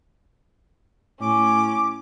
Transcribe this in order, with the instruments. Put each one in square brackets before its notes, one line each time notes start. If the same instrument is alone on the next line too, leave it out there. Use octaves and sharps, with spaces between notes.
[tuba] A2 [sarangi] C#4 [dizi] D6